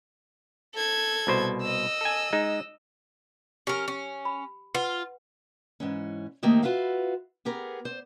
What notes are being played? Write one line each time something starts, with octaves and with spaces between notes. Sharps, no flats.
A4 G#6
C2 B2 C5
D#5 E6
A4 G#5
G#3 D#4
C#4 G4 A#4 C#6
C#4
B5
F4 B4 F#5
G#2 E3 C#4
D#3 A3 A#3 C4 D#4 G4
F4 F#4 B4 E5 F5
B3 G4 G#4 A#4
C5